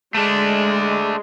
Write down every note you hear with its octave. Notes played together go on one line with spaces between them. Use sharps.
G#3 A3 D4